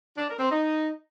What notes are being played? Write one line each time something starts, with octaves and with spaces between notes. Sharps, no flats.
D4
A#4
C4
D#4